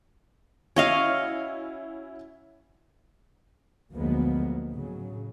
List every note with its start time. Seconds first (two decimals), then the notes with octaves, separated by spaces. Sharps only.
0.76 C#4 E4 F#4 C#5 D#5 F5
3.93 D2 F3 F#3 G#3 A#3 B3
4.70 A2 C#3 F#3